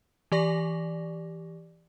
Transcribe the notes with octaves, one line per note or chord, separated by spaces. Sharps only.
E3 G4 D5 C#6 A#6